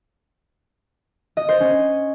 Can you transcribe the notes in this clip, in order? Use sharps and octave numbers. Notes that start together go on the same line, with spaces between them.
D#5
C5
C#4